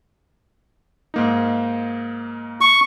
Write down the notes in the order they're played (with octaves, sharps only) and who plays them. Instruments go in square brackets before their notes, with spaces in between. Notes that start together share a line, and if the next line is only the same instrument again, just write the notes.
[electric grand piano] G#2 A#3 D#4
[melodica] C#6